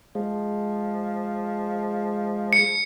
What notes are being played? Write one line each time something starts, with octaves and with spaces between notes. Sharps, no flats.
F3 G#3
C#7